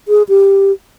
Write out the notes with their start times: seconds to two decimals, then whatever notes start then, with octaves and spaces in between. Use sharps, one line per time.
0.08 G#4
0.29 G4